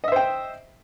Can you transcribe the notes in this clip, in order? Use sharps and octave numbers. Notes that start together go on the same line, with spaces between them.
C5 D#5 E5 G5